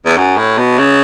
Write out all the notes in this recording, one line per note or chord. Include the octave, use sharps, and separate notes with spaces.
E2
F#2
A2
B2
C#3